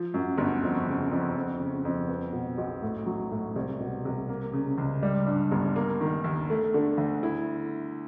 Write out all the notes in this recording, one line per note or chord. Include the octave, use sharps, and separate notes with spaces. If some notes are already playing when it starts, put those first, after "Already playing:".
Already playing: F3
F#2
G1
F2
C#3
F2
F2
C#3
F2
B3
B2
B1
A2
F#3
A2
C2
B2
C2
A#3
C#3
C#2
G3
G2
G1
A#3
D#3
D#2
A3
D3
D2
E4